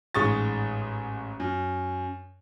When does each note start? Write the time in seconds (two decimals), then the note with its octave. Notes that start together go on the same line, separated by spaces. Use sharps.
0.14 A1 G#2 G#3 C#6 D#6 A6
1.40 F#2